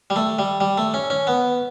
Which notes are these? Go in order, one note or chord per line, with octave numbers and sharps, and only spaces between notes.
G3
A3
G3
G3
A3
C#4
C#4
B3